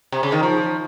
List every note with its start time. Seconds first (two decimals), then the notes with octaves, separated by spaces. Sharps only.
0.12 C3
0.23 C#3
0.32 D#3
0.43 F3